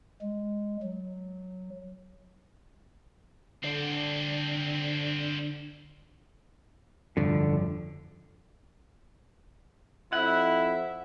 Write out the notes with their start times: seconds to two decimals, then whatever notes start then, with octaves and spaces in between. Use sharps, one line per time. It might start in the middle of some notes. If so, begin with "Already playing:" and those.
0.22 G#3
0.83 F#3
3.64 D3 C4 D4
7.17 F1 G2 D3 F3
10.13 F2 E4 E5 F#5